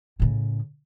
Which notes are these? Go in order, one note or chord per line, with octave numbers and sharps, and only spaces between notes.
A2 C#3